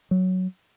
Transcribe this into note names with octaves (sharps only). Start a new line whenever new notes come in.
F#3